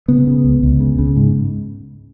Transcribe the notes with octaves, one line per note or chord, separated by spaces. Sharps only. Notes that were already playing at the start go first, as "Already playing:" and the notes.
C#3 B3
C#3
C#2
C#2
C#3
C#3
G#2